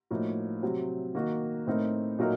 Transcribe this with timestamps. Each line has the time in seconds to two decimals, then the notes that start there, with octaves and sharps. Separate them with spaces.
0.10 A2 F3 A#3 D#4 F#4
0.62 C3 F#3 C4
1.15 D#3 A#3 D#4 F#4
1.67 A2 A3 C4 D#4 A#4
2.19 A#2 F#3 A3 D#4 A#4